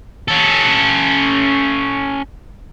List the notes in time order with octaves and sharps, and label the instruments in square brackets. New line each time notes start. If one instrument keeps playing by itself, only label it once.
[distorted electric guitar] C#4 A4